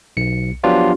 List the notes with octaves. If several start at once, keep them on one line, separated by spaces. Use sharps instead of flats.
B1 C#7
F3 F#3 B3 D4 F4 G4